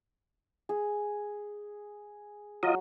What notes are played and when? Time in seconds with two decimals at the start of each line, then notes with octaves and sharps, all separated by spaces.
0.69 G#4
2.63 F#3 F4 D#5